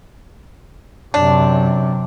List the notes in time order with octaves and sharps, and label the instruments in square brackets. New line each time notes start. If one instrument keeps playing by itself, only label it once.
[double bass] F#2 C3 [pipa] D4